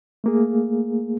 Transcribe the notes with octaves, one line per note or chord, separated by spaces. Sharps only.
A3 A#3 G#4